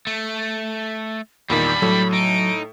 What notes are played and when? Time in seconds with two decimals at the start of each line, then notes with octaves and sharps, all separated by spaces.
0.07 A3
1.50 E2 A#2 D#3 G3 D4 B5
1.82 A2 F#3 A4
2.13 D#4 D7